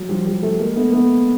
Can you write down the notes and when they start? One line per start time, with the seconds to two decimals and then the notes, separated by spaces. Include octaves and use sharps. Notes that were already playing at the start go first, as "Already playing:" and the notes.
Already playing: F#3
0.09 F3 G3
0.25 F3 G3
0.42 G3 A3
0.59 G#3 A#3
0.76 A3 B3
0.92 A3 B3